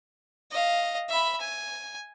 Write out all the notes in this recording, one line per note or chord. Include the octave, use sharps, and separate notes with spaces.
D#5 F5
E5 B5
G#5